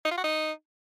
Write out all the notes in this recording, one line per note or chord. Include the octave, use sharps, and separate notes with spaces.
D#4
F4
F#4
D#4